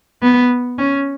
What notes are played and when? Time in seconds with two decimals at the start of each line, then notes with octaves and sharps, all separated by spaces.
0.22 B3
0.78 C#4